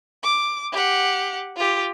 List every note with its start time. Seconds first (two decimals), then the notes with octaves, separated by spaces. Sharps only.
0.23 D6
0.72 G4 F#5
1.57 F4 G4